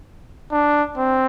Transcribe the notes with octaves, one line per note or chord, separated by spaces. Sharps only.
D4
C4